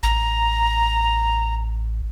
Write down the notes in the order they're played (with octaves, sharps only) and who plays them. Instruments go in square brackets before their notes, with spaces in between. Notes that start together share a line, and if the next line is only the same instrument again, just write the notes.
[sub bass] A1 [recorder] A#5